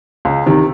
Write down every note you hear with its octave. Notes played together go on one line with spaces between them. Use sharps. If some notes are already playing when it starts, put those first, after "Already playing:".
C#2
C3 D#3